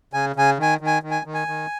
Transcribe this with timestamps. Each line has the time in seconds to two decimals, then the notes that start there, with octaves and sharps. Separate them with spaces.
0.13 C#3 G#5
0.36 C#3 G#5
0.58 D#3 G#5
0.81 D#3
0.86 G#5
1.03 D#3
1.11 G#5
1.25 D#3
1.34 G#5
1.48 D#3